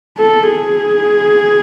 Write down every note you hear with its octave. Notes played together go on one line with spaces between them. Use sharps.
A4
G#4